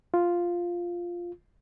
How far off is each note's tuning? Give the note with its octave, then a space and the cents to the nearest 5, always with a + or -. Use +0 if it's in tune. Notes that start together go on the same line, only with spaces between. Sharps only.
F4 +0